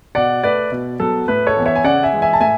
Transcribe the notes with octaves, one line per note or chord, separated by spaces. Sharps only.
B2 D5 F#5
A3 B4 D5
B2
F#3 B3 A4
A2 B4
A4 C#5
E3 B3
C#5 E5
G#5
C#3 D5 F#5
E5 G#5
E3 G#3
E5 G#5
A5
A2 E5 G#5